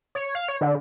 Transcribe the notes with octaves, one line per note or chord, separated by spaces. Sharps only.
C#5
F5
C#5
D3